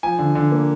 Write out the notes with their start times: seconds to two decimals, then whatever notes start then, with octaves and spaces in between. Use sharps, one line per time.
0.03 F3 G#5
0.19 D3
0.35 D3
0.52 A#3